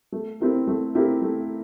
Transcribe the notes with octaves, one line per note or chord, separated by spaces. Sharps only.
A3
C4 E4 G4 A#4
A3
C4 E4 G4 A#4
A3